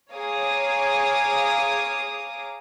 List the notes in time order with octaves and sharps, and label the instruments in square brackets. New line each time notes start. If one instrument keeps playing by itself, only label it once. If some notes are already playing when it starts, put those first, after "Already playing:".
[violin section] G#4 C#5 F5 A#5 D6 D#6